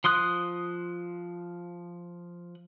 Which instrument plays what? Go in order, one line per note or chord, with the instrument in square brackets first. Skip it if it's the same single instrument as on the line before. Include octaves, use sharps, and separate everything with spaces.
[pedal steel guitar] F3 C6 D#6 F#6